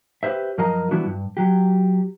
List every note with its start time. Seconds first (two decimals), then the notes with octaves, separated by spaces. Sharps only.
0.23 G4 G#4 B4 C5 E5
0.58 F#2 F3 A#4 D#5 F5 A#5
0.91 E3 G3 B3 D4 E4 F#4
1.06 G2
1.37 F#3 G4